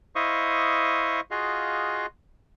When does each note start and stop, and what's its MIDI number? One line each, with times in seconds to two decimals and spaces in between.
0.15 1.20 64
0.15 1.20 72
0.15 1.20 75
0.15 1.20 77
0.15 1.20 85
0.15 1.20 87
1.31 2.06 65
1.31 2.06 66
1.31 2.06 68
1.31 2.06 75
1.31 2.06 77